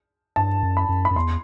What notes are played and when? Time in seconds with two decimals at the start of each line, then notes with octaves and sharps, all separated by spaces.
0.36 G2 A5
0.63 F#2
0.77 B5
0.89 F#2
1.05 B5
1.11 F#2
1.16 E2 C6